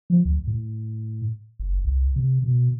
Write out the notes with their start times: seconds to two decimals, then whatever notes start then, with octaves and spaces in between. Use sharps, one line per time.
0.10 F3
0.25 D2
0.47 A2
1.59 F#1
1.85 C2
2.16 C3
2.44 B2